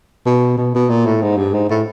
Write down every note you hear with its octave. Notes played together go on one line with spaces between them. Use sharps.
B2
B2
B2
A#2
A2
G#2
G2
G#2
A2